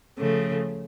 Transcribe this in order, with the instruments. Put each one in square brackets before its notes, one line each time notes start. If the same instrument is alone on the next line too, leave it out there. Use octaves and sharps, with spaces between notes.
[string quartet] C#3 F3 A3